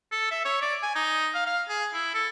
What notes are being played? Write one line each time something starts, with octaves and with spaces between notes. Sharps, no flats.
A4
E5
C#5
D5
G#5
D#4
F5
F5
G#4
E4
A4